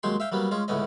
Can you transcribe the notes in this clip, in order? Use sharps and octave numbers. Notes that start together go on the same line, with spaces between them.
D#2 F#3 G#3 G5 C6
E5 F5 G5
F#3 G3 A#3 B3
G#3 C#4 F4
C#2 A2 D3 B3 C#4 D#5